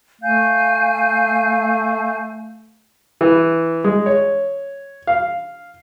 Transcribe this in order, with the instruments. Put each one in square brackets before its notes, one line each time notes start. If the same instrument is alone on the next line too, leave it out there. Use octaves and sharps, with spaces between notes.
[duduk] A3 [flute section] F5 G#5 G6
[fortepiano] E3
G#3
C#5
F5